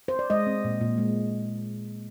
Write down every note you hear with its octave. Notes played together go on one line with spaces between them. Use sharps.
C5
D5
G#3 D#5
C4
A#2
A#2
G#3